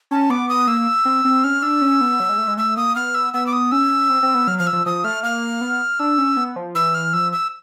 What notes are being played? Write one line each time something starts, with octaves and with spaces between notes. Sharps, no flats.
C#4 A5
B3 D6
D#6
A#3 E6
C4
C4
C#4 F6
D4 E6
C#4
B3
F#3
G#3
A3
G#3
A3 E6
A#3 D#6
B3 F6
E6
B3 E6
D6
D#6
C#4 E6
C4
C4
B3
F#3 F6
F3 F6
E6
F3
F3 D#6
A3 F6
A#3 F6
B3
D4 E6
C#4
B3
F3
E3 E6
F6
F3 E6
E6